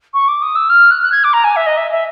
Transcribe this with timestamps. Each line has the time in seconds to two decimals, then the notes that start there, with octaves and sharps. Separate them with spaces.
0.14 C#6
0.28 D6
0.42 D#6
0.56 E6
0.70 F6
0.91 F#6
1.02 F#6
1.12 G#6
1.24 D6
1.33 A#5
1.44 G#5
1.56 E5
1.66 D#5
1.77 E5
1.91 E5